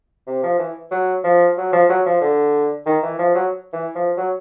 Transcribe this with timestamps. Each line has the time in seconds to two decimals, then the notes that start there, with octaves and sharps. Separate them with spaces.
0.27 C3
0.43 F3
0.59 E3
0.91 F#3
1.24 F3
1.57 F#3
1.73 F3
1.89 F#3
2.06 F3
2.21 D3
2.86 D#3
3.03 E3
3.19 F3
3.35 F#3
3.73 E3
3.95 F3
4.17 F#3